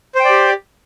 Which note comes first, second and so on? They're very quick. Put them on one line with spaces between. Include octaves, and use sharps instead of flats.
C5 G5 D5 G4